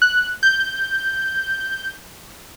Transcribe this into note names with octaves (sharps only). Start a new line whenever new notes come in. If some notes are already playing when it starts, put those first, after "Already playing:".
F#6
G6